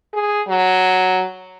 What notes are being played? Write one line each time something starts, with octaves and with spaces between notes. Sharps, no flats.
G#4
F#3